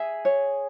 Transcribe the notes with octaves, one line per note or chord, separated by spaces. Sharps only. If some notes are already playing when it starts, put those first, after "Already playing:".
Already playing: G#4 E5
C#5